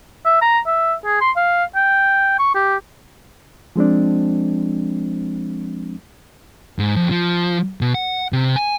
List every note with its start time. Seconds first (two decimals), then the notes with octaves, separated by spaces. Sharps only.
0.25 E5
0.42 A#5
0.67 E5
1.05 G#4
1.21 C6
1.36 F5
1.76 G5
2.39 C#6
2.55 G4
3.76 F3 G#3 C4 D4
6.79 G#2
6.96 F2
7.11 F3
7.81 B2
7.94 F#5
8.33 C3
8.56 G#5